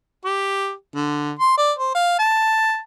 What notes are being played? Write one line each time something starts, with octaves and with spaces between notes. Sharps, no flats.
G4
D3
C6
D5
C5
F5
A5